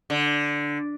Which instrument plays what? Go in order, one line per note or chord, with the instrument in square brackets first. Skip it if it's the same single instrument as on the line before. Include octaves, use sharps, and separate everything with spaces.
[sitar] D3